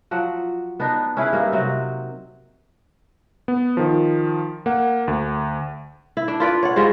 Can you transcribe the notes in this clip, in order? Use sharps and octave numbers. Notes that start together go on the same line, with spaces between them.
F3 F#3 F#5
B3 D4 D#4
C#4 E4 G#4 B4
G2 A#3 D#4
C3 F#3 C4
B3
D#3 F3
A#3 F#5
D2
E4
D4
F4 B4 D5
C#5 F#5
G3 G#3 F4 C5